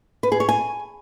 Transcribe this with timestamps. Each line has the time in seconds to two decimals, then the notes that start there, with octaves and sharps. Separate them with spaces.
0.23 B4
0.32 G#4
0.40 C#5
0.49 G#5